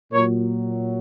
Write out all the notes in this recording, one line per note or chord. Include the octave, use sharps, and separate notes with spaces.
A#2 F#3 A#4 C#5